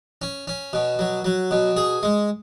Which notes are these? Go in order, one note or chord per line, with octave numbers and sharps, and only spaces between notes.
C#4
C#4
B2
F#3
F#3
B2
G#4
G#3